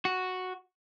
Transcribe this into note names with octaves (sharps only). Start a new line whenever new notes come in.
F#4